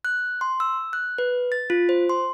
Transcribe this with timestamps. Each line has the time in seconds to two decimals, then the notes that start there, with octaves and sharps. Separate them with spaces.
0.05 F#6
0.41 C6
0.60 E6
0.93 F#6
1.18 B4
1.52 A6
1.70 F4
1.89 C5
2.09 C6